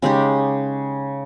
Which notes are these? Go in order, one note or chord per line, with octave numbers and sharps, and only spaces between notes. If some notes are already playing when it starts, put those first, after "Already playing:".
C#3 G#3 D#4 G4